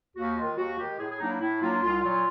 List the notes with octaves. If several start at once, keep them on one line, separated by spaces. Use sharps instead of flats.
D#2 F#4
D#3 G#3 F4
D#2 F#4
D#3 G#3 G4
A2 G#4
G#4
F#3 A#3 D4 D#4
E4
A2 E4
F#3 A#3 D4 F4
C2 F4
A#2 F#3 F4